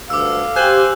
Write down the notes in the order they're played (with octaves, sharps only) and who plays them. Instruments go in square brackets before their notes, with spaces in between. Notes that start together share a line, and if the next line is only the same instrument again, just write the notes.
[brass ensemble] D2 G2 D3 [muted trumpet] F5 [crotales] D6 E6
[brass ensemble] G4 [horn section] C5 G#5 [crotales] F#6 F#7